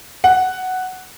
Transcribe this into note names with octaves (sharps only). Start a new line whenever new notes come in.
F#5